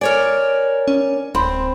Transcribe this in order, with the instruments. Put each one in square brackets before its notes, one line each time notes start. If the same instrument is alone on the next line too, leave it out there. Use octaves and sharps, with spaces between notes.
[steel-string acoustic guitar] A#4 C#5 D5 [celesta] G#5
[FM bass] C#4
[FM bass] D1 [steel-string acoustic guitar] C4 [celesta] B5 C6